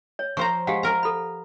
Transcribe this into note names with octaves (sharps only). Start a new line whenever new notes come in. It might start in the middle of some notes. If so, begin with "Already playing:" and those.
C#5
F3 C5 A#5 C#6
G#3 G4 F5 F#5
A#4 A#5
A4 B5